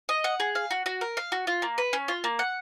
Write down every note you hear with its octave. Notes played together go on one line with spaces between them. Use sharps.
D#5
F#5
G#4
F5
F#4
F#4
A#4
F5
F#4
F4
A#3
B4
C#4
F4
A#3
F#5